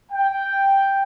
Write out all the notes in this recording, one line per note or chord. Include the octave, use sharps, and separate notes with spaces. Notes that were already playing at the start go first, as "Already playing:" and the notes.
G5